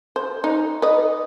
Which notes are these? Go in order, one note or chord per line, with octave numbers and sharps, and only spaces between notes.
C5
D#4
B4 D#5